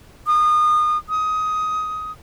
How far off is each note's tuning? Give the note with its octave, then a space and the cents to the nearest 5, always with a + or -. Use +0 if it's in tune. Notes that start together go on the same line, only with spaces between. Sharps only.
D#6 -30
D#6 +15